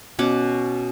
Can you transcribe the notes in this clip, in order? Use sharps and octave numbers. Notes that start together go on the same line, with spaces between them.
B2 C#4 F#5 D6